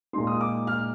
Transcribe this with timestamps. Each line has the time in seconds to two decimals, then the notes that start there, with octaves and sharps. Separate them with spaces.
0.13 A#2 G#3 D#4 C6
0.27 D#6
0.41 D6
0.67 F6